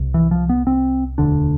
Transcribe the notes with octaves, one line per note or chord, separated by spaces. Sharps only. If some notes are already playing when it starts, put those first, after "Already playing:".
Already playing: C2 C3
E3
F3
B3
C4
E1 D2 D3 D4